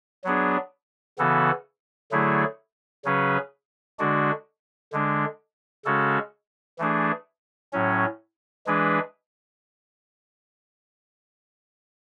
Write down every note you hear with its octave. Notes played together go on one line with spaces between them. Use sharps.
F#3 B3 D4 G#4
C#3 E3 B3 F#4 A4
D3 F#3 A3 E4 G#4
C#3 F#3 C#4 G#4 B4
D3 G#3 D4 F#4
D3 G#3 D4
C#3 G#3 C#4 F#4 A4
E3 A3 D4 G#4
A2 F#3 C#4
E3 G#3 D4 G#4 B4